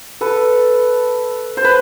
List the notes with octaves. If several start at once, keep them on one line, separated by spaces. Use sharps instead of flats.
A4 B4
C5
B4